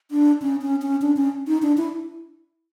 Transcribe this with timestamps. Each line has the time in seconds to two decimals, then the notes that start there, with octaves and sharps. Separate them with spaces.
0.11 D4
0.42 C#4
0.62 C#4
0.82 C#4
1.02 D4
1.17 C#4
1.47 D#4
1.62 D4
1.77 E4